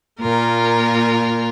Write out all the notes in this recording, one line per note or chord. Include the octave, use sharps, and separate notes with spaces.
A#2 A#3 F4 A#4